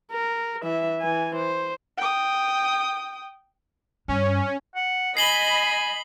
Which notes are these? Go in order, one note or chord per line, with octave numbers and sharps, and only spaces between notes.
A#4
E3 E5
E3 G#5
C5
G5 D#6
G2 C#4
F#5
D#5 G#5 B5 C7 F#7 G7